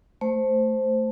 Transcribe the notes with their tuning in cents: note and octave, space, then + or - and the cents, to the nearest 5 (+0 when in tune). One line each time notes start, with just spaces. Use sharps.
A3 +0 C5 +0